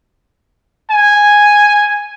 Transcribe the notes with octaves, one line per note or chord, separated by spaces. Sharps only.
G#5